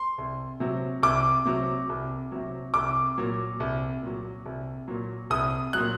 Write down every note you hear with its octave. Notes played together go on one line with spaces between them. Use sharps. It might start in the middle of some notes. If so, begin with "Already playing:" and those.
Already playing: C6
C2
C3 F#3
C2 D6
C3 F#3
C2
C3 F#3
C2 D6
A#2 F#3
C2
A#2 F#3
C2
A#2 F#3
C2 D#6
A#2 F#3 F#6